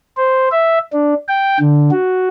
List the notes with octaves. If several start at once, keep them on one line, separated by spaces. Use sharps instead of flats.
C5
E5
D4
G5
D3
F#4